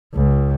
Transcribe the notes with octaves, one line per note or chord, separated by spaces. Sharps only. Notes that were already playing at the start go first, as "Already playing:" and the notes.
C#2